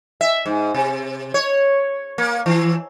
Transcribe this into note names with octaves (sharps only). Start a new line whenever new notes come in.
E5
G#2
C3
C#5
A#3
E3